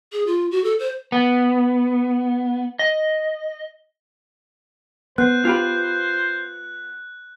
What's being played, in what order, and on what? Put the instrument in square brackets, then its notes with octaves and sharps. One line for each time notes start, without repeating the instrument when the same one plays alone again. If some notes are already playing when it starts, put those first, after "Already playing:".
[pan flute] G#4
F4
F#4
A4
C5
[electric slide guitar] B3
D#5
[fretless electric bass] B3 [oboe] C5 [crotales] F#6
[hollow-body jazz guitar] F4 G4 B4